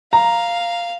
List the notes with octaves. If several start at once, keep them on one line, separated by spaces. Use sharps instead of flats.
F5 A#5